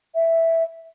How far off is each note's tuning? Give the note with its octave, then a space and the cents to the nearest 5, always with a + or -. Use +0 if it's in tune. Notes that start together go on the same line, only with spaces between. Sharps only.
E5 +0